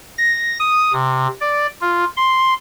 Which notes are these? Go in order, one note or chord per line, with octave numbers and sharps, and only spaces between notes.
A#6
D#6
C3
D5
F4
C6